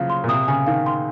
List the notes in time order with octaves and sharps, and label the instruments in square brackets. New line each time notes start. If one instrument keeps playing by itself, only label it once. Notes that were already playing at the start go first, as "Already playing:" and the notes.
Already playing: [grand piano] C#3 F3 F#3 [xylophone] F5
[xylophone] C6
[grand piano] A#2
[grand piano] C3 [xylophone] D#6
[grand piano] C#3 [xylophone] G#5
[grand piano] D#3 [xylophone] F5
[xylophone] C6